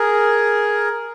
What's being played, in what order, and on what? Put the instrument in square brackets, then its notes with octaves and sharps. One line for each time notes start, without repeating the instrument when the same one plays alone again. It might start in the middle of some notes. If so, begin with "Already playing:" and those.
Already playing: [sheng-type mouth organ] G#4 A#4